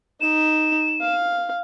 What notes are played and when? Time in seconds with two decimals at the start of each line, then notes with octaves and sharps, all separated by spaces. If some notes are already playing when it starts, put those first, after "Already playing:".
0.21 D#4 E7
1.01 F5